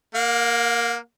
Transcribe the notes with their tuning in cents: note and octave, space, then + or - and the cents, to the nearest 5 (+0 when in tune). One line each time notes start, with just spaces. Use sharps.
A#3 +5 F5 +45